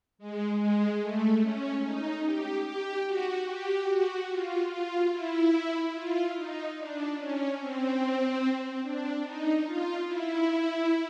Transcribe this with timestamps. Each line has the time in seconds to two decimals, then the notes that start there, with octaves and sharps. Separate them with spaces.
0.18 G#3
0.60 G#3
1.01 A3
1.41 C#4
1.83 D#4
2.25 G4
2.66 G4
3.07 F#4
3.48 G4
3.89 F#4
4.30 F4
4.70 F4
5.12 E4
5.94 F4
6.35 D#4
6.77 D4
7.18 C#4
7.59 C4
8.82 D4
9.23 D#4
9.64 F4
10.06 E4